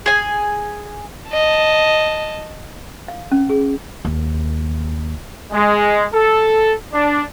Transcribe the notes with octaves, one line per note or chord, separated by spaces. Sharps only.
G#4 G#5
D#5 A5
F5
C#4
G#4
D#2
G#3
A4
D4